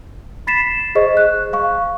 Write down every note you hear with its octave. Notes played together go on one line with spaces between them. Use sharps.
B5 A6 B6 C7 E7
G#4 C5 D#5 C#6
F#6
F5 C#6